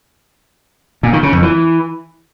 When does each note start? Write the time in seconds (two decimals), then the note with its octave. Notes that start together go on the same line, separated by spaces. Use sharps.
1.03 A#2
1.13 D#3
1.23 C#3
1.33 F2
1.43 E3